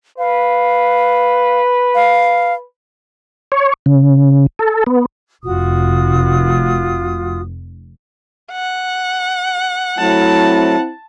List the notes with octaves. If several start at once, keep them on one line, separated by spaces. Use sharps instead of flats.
B4 F5
F5
C#5
C#3
A4
B3
F1 F4 F#4 D#6
F#5
F#3 A3 C4 E4 A5